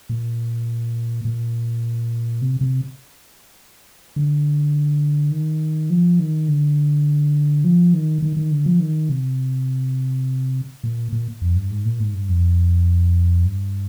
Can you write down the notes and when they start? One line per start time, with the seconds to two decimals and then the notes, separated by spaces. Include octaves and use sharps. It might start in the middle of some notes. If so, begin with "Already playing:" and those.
0.09 A#2
1.25 A#2
2.42 C3
2.61 C3
4.16 D3
5.31 D#3
5.90 F3
6.20 D#3
6.48 D3
7.64 F3
7.94 D#3
8.22 D#3
8.37 D#3
8.51 D3
8.66 F3
8.80 D#3
9.09 C3
10.83 A#2
11.12 A#2
11.42 F2
11.56 G2
11.71 G#2
11.85 A#2
12.00 G#2
12.14 G2
12.29 F2
13.45 G2